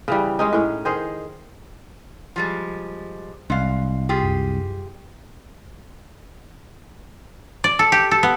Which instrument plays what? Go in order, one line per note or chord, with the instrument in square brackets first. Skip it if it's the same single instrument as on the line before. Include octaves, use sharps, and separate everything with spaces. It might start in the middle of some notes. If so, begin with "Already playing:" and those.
[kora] C#3 E3 G3
G#3 C#4 D#4
A2 C#4
D#3 G#4 C5
[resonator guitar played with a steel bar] F3 G3 G#3
[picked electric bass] C2 [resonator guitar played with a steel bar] G#3 F5
[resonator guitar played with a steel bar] F4 G4 G#4
[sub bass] F#2
[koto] D5
A4
G4
A4
B3